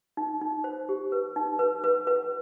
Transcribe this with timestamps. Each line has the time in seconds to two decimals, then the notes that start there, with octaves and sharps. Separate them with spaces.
0.17 D#4
0.41 D#4
0.64 C5
0.89 G4
1.12 B4
1.36 D#4
1.59 B4
1.84 B4
2.07 B4